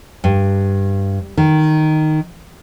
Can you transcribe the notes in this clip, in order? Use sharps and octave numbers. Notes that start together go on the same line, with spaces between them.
G2
D#3